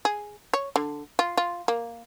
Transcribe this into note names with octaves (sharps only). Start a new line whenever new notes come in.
G#4
C#5
D3
F4
F4
A#3